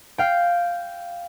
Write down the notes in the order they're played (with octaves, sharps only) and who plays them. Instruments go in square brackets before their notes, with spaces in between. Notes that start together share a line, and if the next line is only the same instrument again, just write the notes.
[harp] F5 G5